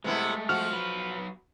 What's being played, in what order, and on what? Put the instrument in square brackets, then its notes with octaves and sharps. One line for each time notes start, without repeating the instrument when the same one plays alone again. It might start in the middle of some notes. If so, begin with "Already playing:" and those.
[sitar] C3 B3 E4 [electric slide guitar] G#3 A3
[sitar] F3 F#4 [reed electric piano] F6
[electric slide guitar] F#3 B4